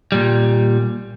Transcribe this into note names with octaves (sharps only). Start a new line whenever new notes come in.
A#2 G3